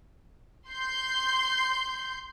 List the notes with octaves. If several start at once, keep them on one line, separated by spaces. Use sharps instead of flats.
C6 G6